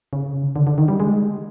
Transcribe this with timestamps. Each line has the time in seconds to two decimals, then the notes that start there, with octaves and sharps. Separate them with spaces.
0.13 C#3
0.56 D3
0.67 D3
0.78 D#3
0.88 G3
1.00 G#3